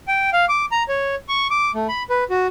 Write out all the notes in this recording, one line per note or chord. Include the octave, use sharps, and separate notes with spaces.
G5
F5
D6
A#5
C#5
C#6
D6
A3
B5
B4
F#4